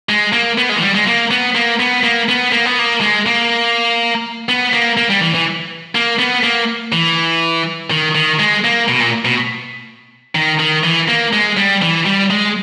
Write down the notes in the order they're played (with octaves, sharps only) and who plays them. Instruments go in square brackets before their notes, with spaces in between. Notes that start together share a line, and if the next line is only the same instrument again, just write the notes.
[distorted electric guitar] G#3
A#3
B3
G#3
E3
G3
G#3
A#3
B3
A#3
B3
A#3
B3
A#3
B3
A#3
G#3
A#3
B3
A#3
A#3
G3
E3
E3
A#3
B3
A#3
E3
D#3
D#3
G#3
A#3
B2
A#2
B2
D#3
D#3
E3
A#3
G#3
G3
E3
G3
G#3